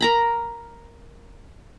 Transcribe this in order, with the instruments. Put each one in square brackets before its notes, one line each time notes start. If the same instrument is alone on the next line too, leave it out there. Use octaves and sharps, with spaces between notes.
[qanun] A#4 A#5 B5